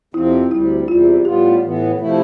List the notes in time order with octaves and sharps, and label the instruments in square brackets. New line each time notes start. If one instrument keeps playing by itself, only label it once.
[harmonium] F2 C3 F3 C4 [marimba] E4
[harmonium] D2 C3 G3 [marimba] E4
[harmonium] E2 C3 G3 [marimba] F4
[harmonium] A2 G3 B3 F4 [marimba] G4
[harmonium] A2 E3 B3
C3 F3 A3 E4